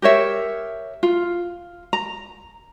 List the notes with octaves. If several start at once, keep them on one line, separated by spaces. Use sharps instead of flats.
G4 A#4 C#5 E5
F4
A#5